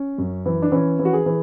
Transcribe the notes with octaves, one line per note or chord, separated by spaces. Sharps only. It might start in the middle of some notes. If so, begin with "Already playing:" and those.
Already playing: C#4
F#2
E3
D4
E3 C#4
E3
F#4
G#4
E3